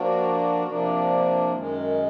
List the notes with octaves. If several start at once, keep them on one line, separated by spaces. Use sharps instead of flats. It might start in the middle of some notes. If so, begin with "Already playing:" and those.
Already playing: F3 A#3 D4 F#4
C3 F3 A#3 D4
F#2 D#3 G#3